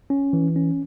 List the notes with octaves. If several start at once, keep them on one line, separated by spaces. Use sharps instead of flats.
C#4
E3
C#4